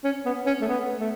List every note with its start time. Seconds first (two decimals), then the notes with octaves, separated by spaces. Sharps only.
0.04 C#4
0.26 B3
0.46 C#4
0.62 A3
0.68 B3
1.00 A3